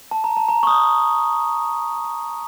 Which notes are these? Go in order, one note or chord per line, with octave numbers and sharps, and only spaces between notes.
A5
A#5
A5
A#5
C#6
D#6